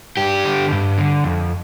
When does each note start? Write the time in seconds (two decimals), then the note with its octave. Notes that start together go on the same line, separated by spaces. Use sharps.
0.17 G2 G4
0.44 D3
0.71 G2
0.98 D3
1.24 F2